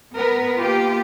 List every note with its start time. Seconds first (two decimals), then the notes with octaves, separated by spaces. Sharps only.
0.14 B3 A#4 B4
0.59 A#3 F4 G4